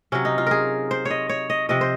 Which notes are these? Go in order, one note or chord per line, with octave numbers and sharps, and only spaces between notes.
C3 F#3 C#4
D#4
F4
G#4 A#4
C5
C#5
D#5
C#5
D#5
C3 F3 D#5
C5